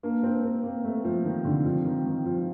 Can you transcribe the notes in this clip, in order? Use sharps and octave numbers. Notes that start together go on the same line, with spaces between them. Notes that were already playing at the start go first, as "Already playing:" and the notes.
A#3 D4
C4
A#3 C4
A#3
A3
F3
D#3
D3
F3
D#3
D#3
F3